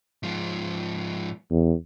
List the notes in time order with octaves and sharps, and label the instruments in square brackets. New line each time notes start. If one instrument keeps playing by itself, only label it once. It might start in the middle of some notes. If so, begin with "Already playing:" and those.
[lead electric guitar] G#2 F3
[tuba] E2